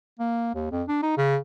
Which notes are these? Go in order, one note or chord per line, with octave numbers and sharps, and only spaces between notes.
A#3
D#2
F2
D4
D#4
C#3